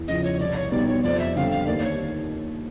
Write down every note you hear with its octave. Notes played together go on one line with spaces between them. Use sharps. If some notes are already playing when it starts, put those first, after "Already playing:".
Already playing: E2
C#3 F3 D#5
C#5
C2 D5
C#5
B2 G3 B3 D#4 D5
C#5
F2 D5
E5
D3 G3 C4 F5
F5
D#2 D5
D5
C#5